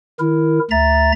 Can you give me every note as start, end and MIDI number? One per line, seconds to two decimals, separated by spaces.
0.20 0.59 51
0.20 0.59 64
0.20 0.59 70
0.71 1.12 38
0.71 1.12 76
0.71 1.12 82
0.71 1.12 93